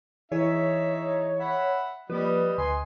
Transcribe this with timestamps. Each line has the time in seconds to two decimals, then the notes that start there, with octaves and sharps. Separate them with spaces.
0.32 E3 D#4 G#4 C#5 E5
1.39 E5 F#5 B5
2.10 F3 G3 A#3 B4 D#5
2.58 D2 D#5 G#5 C6